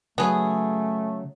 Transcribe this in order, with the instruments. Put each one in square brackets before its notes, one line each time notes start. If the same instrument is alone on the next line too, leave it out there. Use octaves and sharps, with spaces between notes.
[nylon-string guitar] C#3 F#3 [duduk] A3 [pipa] B3 G#4